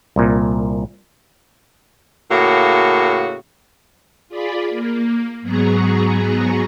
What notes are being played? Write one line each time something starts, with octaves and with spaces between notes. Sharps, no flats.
C2 A#2
A2 C#3 A#3 F#4
F4 G#4 D5 B5
A#3
G#2 F#3 B3 G#4 A#5 C#6